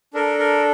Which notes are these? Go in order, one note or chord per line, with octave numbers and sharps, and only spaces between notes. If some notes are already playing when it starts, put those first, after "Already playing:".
D4 A4 A#4
A#4